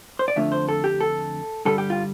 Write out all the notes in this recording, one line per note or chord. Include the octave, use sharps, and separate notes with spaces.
C5
D5
F2 D3 A3 D4 F4 E5
C5
A4
G4
A4
G2 D3 G3 A4
G4
F4